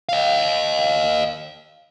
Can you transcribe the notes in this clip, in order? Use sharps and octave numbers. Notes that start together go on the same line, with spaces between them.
D#5 F5